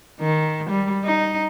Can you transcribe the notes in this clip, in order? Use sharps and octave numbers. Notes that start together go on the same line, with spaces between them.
D#3
G3
D#4